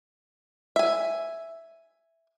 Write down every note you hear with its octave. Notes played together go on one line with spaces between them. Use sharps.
E5 G#5